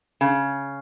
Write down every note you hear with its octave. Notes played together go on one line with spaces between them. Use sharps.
C#3